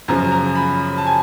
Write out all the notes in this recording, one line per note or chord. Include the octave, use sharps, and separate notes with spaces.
F#2 C#3 F3 A#5
A#5
B5
A5
G#5